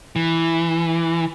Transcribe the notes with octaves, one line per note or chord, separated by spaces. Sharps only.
E3